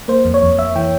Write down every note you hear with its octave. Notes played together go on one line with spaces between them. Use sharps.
A#3 C5
F2
C#5
F2
F2 E5
E3 G5